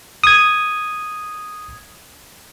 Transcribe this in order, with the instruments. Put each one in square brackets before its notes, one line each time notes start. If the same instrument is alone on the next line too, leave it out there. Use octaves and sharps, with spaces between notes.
[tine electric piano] D#6 G#6